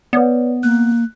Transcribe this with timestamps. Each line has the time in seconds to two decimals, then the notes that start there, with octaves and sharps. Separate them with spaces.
0.13 B3 B4 C#5 D5
0.63 A#3 F#6